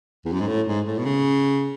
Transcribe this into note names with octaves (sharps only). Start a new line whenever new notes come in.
E2
F#2
G#2
A2
G#2
A2
B2
C#3